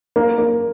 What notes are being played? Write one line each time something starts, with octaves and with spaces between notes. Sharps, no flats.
A#3
A#3